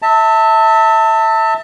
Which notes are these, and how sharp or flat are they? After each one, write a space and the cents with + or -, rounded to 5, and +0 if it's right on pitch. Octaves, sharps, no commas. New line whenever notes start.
E5 -20 A5 +25